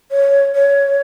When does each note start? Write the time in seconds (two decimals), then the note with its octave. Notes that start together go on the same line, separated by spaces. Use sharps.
0.11 C#5
0.55 C#5